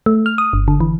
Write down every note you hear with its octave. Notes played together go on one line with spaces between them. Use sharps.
A3
F6
D#6
G1
D3
E3